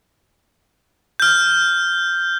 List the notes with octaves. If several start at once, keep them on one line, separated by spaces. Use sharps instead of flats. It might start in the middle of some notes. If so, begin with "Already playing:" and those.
F6 G6